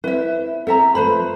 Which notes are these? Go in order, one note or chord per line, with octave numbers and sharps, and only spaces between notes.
C4 E4 B4 E5
C4 A4 E5 A#5
F3 A3 A4 B4 C5 B5